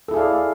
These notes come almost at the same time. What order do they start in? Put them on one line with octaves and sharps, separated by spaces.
A4 E4 G#4 F5 D5